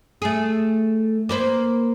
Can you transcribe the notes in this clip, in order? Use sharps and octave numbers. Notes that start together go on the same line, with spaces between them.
A3 G#4
A#3 B4 C5